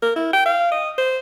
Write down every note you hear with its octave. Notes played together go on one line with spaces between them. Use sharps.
A#4
E4
G5
F5
D#5
C5